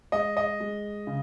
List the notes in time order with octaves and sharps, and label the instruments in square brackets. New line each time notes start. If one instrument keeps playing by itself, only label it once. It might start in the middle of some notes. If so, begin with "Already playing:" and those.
[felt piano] G#3 [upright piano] D#5
[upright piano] D#5
[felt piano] G#3
C#3